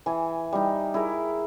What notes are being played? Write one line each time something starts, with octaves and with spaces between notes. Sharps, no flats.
E3 G#5
G3 D#4
E4 G#4 A#4